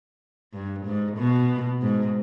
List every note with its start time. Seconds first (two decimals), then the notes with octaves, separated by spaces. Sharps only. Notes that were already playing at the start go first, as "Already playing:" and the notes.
0.54 G2
0.86 G#2
1.18 B2
1.82 G#2